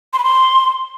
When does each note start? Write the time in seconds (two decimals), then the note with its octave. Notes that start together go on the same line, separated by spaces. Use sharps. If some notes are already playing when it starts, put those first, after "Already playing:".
0.13 C6
0.19 B5
0.24 C6